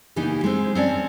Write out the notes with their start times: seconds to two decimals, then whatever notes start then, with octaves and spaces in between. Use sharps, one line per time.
0.16 C#3 E3 A#3 B3 D#4 G4
0.44 G#3 C4
0.75 C4 C#4 D5 A5